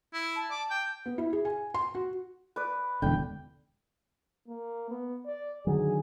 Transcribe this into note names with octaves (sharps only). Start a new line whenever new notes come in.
E4
A5
D5
G5
B3
E4
G#4
G#5
C6
F#4
B4 D5
E1 D3 G5
A#3
B3
D5
D3 D#3 F#3 G#4